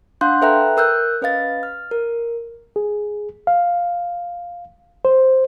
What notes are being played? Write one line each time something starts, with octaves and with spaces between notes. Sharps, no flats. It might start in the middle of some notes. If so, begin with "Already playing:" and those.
D4 F5 F#5 C6 F#6 G6
A4 B4 E5 G5 A#5 F#6
A#4 E6 F#6 G6
C#4 B4 D#5 F5 A6
F6
A#4
G#4
F5
C5